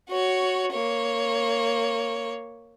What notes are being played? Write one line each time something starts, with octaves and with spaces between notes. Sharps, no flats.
F#4 C#5
A#3 C#5